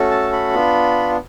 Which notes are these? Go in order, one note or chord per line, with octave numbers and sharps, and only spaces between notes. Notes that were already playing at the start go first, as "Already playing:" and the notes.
Already playing: A3 C#4 F#4 A4
A5
B5
B3 D4 F4